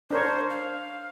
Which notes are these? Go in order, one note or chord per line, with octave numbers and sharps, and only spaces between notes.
D4 A#4 C5 C#5
F5